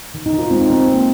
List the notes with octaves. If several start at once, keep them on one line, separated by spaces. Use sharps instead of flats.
D#3
D#4
D#3
F4
G#3 C4
D#4
D#3 C4
A#3